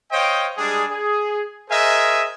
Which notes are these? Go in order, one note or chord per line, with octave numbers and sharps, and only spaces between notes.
C5 C#5 D#5 F5 G5
G3 G#3 D4 G#4
G#4
G#4 A#4 C5 D#5 E5 G#5